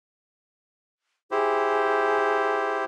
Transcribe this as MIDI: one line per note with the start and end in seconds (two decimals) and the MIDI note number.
1.32 2.85 64
1.32 2.85 67
1.32 2.81 68
1.32 2.85 72